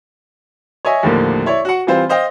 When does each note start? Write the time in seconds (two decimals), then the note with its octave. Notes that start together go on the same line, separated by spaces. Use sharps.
0.85 C#5 D#5 E5 G#5
1.03 D#2 A2 D3 F3 A#3
1.46 E4 C#5 D5
1.65 F#4 F#5
1.87 E3 G3 C4 F4 C5
2.09 C5 D#5 F5 G5